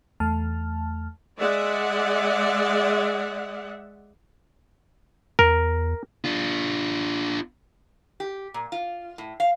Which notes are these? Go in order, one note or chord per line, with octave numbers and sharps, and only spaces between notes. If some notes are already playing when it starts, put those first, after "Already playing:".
E2 A3 A5 F6
G#3 D5 E5 F#5
E2 A#4
D4 F4
G4
A#2
F4
A2
F5